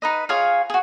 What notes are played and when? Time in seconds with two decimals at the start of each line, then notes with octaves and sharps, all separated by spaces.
0.02 D#4 B4 D#5
0.29 F4 G#4 C#5 F5
0.70 F#4 G#4